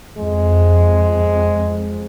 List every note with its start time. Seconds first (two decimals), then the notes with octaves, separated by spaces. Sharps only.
0.18 F2 G#3